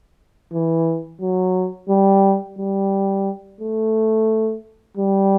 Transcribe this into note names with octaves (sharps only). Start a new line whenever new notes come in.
E3
F#3
G3
G3
A3
G3